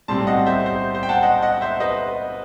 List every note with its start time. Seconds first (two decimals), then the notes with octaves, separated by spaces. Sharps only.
0.08 B1 A2 G3 C4 A5 C6
0.27 D#5 F#5
0.46 C5 E5
0.66 C5
0.95 C5
1.03 G5
1.09 F#5 A5
1.23 D#5 F#5
1.42 D#5 F#5
1.61 C5 E5
1.80 B4 D#5